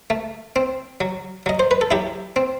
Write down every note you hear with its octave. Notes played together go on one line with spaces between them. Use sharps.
A3
C4
F#3
F#3 D#5
C5
B4
A4
F#3 E4 G4
C4